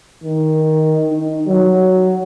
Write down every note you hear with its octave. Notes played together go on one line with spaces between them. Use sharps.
D#3
D#4
F#3